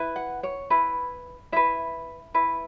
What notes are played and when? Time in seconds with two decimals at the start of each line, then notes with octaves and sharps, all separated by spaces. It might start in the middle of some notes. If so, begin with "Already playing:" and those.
Already playing: E4 B4
0.16 F#5
0.43 C#5
0.70 E4 B4
1.52 E4 B4 E5
2.34 E4 B4